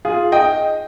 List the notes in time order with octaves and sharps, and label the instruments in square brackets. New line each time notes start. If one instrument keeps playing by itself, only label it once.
[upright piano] F4 G#4
D#5 G5